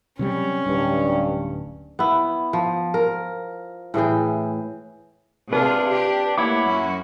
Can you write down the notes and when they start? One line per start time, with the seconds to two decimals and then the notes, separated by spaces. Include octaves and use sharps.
0.19 C3 F#3 G3 C#4
0.66 D1 G2
1.99 B3 E4
2.53 F3
2.94 A#4
3.94 A2 E3 G#4 G5
5.53 C3 D4 F4 G#4 B4 F6
5.89 G4
6.38 A3 A#3 E4 C#5 F#5 D6
6.67 F#2 C#4 F#4